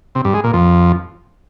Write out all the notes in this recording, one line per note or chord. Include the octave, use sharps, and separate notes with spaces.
C3
G2
G#3
A#2
F2